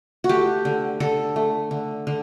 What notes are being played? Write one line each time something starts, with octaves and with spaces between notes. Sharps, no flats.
F#4
A3 G4
D3
D3 A4
A3
D3
D3